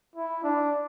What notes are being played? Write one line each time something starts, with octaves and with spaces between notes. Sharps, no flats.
E4
D4